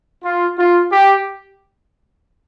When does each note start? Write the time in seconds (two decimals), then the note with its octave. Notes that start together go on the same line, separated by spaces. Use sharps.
0.23 F4
0.57 F4
0.91 G4